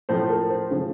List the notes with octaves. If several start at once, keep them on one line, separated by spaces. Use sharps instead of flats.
A2 F3 A3 C5
A#4
C5
C#3 F3 A3 C5